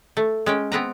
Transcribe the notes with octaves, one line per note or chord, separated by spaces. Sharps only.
A3
G#3 C#4 G5
B3 C4 B4 A#5